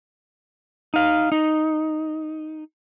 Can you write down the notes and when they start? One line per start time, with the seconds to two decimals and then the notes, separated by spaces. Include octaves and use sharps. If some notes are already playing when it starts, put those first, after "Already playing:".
0.94 D#4 F5
1.32 D#4